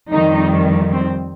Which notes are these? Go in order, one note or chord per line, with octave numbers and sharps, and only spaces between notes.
F2 D#3 G3 D#4
C4